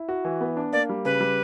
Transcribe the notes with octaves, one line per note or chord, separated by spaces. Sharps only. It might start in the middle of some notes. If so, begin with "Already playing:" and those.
Already playing: E4
F#4
E3
B3
D4
A#3 D5
G3
C#3 B4
G3